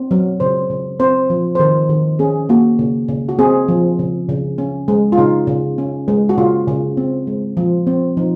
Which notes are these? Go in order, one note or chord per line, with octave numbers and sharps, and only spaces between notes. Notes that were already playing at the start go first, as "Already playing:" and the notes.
Already playing: C4
F#3
C#3 C5
C#3
C4 C5
F3
C5
D#3 A#4
D#3
C#4 G#4
A#3 F#4
C#3
C#3
F#4
C4 G#4
F3
C#3
C#3
C#4
G#3
F4
C#3 D#4
C#3
C#4
G#3
F#4
C#3 F4
C#3
C4
G#3
F3
C4
F3 D#4